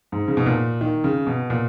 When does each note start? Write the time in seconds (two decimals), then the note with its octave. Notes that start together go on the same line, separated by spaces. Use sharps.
0.12 G#2
0.28 C#3
0.37 B2
0.46 A#2
0.81 D#3
1.04 C#3
1.27 B2
1.50 A#2